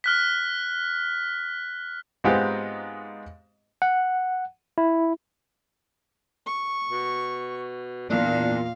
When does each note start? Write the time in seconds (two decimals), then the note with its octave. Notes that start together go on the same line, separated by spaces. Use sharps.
0.04 F6 F#6 B6
2.24 G#2 G#3 B3 C4 F4 G4
3.82 F#5
4.78 E4
6.46 C#6
6.91 B2
8.10 E2 A#2 D4 F5